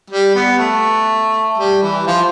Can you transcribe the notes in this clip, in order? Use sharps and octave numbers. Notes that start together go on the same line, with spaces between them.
G3
B3
A3
G3
E3
F3